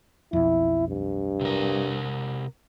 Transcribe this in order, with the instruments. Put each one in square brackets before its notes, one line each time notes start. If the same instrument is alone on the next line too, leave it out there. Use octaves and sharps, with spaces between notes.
[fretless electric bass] B1 F2 [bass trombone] E4
[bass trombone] G2
[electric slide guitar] C3 A#4